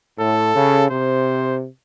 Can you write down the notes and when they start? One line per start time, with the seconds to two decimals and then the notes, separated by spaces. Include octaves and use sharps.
0.18 A2 A4
0.55 C#3
0.91 C3 C5